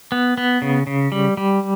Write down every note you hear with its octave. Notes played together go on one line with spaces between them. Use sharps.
B3
B3
C#3
C#3
G3
G3